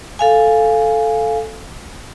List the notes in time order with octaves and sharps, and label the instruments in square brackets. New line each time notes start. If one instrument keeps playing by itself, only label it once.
[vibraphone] A4 F5 G#5